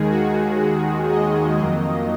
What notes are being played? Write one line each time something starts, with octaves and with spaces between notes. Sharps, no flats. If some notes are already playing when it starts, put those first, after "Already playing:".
Already playing: D#2 D#3 G#3 G#4
F#4
F#4
D#5
F2 D#3 F#3 A#3